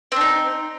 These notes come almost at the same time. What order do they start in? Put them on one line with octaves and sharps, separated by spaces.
C4 D4 D#4